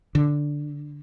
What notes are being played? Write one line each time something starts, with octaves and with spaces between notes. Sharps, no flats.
D3